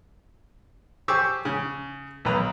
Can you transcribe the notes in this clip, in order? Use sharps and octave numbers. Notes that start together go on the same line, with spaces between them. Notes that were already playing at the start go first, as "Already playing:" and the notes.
G4 G#4 C5 C#6 D6 E6
C#3
B1 D#3 B4 A#5